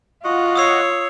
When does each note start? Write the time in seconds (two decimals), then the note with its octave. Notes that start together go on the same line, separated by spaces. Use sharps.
0.24 F4 F#4 D#5 F#5
0.56 C#5 D#6 E6 C7